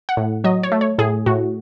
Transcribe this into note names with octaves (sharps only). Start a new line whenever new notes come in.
F#5
A2
F#3 D#5
C#5
A3
C#5
A2 G#4
A2 F#4